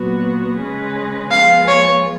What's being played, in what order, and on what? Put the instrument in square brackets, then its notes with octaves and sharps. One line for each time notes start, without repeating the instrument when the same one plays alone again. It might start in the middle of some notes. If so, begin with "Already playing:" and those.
Already playing: [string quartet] A#2 F#3 B3 F#4
C#3 G#3 C#4 G#4 B4
[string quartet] F3 G#3 B3 F4 G#4 [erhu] F5
[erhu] C#5